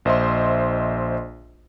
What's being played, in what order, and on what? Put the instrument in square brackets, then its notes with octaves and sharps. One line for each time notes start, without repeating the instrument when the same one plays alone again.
[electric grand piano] A#1 C5 D#5 E5 C6